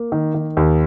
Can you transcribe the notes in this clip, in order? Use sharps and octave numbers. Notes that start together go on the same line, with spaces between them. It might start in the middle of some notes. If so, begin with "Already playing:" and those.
Already playing: A#3
D#3
D#3
D#2